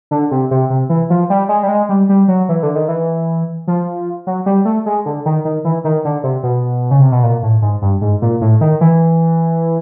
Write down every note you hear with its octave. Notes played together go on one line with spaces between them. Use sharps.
D3
C3
C3
C3
E3
F3
G3
G#3
G3
G#3
G3
G3
F#3
E3
D3
D#3
E3
F3
F#3
G3
A3
G#3
D3
D#3
D#3
E3
D#3
D3
C3
B2
C#3
C3
B2
A#2
A2
G#2
G2
G#2
A#2
A2
D#3
E3